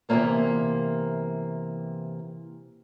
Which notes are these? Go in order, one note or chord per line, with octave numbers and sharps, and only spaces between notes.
C3 E3 F3 G#3 A#3 B3